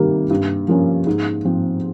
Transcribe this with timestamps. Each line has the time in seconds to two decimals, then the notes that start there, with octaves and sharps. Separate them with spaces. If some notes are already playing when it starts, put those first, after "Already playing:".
Already playing: C3 D#3 G3 A#3
0.30 G2
0.68 F3 A#3 C#4
1.07 G#2
1.45 F3 C4